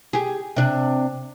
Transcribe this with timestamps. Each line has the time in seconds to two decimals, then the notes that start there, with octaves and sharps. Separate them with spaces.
0.13 G4 G#4
0.56 C3 D4